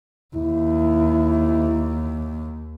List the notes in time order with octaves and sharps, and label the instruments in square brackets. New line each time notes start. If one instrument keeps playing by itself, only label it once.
[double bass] D#2 [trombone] E4